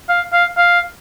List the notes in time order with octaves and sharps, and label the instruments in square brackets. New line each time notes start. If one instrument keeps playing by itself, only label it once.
[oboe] F5
F5
F5